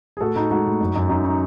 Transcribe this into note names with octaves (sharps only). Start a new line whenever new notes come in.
G#4
A2 F#4 A4
A2 D#4 F#4
G#3 D#4 F#4
A2
F#2
F#2
F#2 D#4
D#4